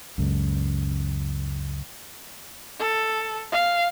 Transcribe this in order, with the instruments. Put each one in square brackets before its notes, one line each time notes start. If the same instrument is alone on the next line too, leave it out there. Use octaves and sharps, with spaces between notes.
[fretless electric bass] C#2 F#2
[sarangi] A4
F5